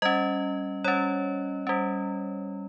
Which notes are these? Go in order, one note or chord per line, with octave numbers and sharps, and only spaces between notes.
G3 C#4 D#5
G3 C#4 C#5
G3 C#4